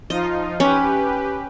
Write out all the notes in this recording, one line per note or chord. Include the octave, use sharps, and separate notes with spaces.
F3 D#4 F4 D#5
C#4 G4 B4